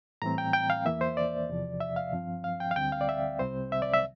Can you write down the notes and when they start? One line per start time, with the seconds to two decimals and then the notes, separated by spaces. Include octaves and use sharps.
0.22 A2 E3 G3 C4 A#5
0.38 G5
0.53 G5
0.70 F5
0.85 E2 E3 A#3 E5
1.01 C5
1.17 D5
1.49 E2 C3 F3
1.81 E5
1.96 F5
2.12 G2 F3 C4
2.44 F5
2.60 G5
2.71 F5
2.76 D2 D3 G3 C4 G5
2.92 F5
3.01 D5
3.09 E5
3.39 C2 C3 G3 C4 C5
3.72 E5
3.82 D5
3.94 E5